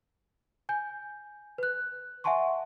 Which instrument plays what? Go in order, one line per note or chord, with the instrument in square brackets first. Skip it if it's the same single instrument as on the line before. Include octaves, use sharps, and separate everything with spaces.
[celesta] G#5 G6
B4 F#6
E5 F#5 G#5 A5 C6 C#6